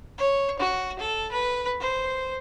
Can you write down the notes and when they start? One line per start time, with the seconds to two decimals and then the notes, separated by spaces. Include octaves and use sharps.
0.18 C#5
0.59 F#4
0.99 A4
1.32 B4
1.80 C5